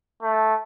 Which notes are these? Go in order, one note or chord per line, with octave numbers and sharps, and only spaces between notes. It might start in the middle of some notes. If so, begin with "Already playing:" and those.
A3